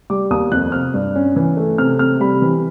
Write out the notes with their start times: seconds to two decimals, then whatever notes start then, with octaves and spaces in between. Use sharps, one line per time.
0.10 G3 D6
0.31 D#2 D#6
0.52 F2 F#6
0.72 C3 F6
0.94 G2
1.15 C#4
1.36 E3
1.57 A3
1.78 C3 F6
1.99 C3 F6
2.20 G3 B5
2.42 E3